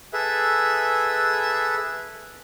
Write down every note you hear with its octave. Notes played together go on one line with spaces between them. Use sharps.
G#4 A4 B4 E5